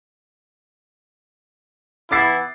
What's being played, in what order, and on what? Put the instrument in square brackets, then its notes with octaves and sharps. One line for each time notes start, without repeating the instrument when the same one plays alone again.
[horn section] E3 B3 E4 [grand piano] D6 A6 C7